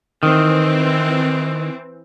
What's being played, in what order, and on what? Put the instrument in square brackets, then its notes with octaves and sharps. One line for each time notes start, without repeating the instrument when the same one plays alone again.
[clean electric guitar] D#3 [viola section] E3 C4